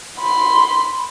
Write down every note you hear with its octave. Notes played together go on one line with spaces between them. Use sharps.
B5 C6